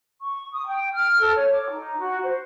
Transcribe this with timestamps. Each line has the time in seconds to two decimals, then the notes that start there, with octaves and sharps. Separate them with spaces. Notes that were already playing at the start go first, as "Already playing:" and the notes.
0.22 C#6
0.53 D#6
0.66 G5
0.94 F6
1.19 A4
1.34 C#5
1.50 D6
1.69 D#4
1.97 F#4
2.24 C5